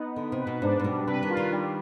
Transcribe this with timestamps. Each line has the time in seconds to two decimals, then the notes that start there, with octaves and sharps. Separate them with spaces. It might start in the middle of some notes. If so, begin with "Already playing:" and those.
Already playing: B3 D#4
0.16 D3 B3
0.32 C3
0.39 B4
0.47 B2
0.62 G#2 D4
0.80 G#2
0.84 B2 G3
1.07 C3 B4
1.23 D#3
1.30 F4
1.37 D#3
1.53 G3